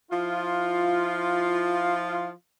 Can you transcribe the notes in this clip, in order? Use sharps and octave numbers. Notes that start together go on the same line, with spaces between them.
F3 E4 F4